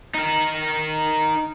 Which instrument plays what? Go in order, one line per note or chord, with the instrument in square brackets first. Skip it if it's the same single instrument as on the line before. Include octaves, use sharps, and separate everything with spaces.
[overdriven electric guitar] D#4 A#4